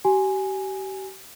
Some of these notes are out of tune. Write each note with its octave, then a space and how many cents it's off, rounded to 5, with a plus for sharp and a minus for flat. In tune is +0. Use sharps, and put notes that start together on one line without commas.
G4 -40 G#5 +0